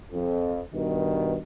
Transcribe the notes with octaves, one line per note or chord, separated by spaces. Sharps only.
F2
G2 B2 D#3